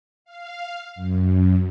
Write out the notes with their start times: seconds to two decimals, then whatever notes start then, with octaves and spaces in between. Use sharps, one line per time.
0.25 F5
0.95 F#2